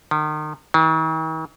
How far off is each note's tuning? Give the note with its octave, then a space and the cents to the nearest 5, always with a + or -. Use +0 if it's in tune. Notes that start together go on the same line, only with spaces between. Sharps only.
D#3 -35
D#3 +45